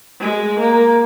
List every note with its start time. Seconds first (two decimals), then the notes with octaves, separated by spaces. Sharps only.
0.20 G#3
0.59 A#3